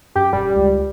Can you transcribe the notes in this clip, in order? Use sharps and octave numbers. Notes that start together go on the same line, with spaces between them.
F#2 G4
D#1 G3
C#2